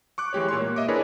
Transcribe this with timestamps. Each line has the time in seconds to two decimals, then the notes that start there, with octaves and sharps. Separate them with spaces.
0.18 C#6 D6 F#6
0.33 E3 G#3 G4 C#5
0.48 A#2 C#5 C6
0.60 A#3
0.76 D#5 E5 D6
0.88 D4 E4 G#4 A#4 B4 C#5